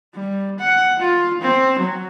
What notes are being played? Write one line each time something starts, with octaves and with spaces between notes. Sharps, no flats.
G3
F#5
F4
C4
F#3